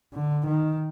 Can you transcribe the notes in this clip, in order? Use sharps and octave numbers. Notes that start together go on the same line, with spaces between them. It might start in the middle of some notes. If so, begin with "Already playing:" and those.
D3
D#3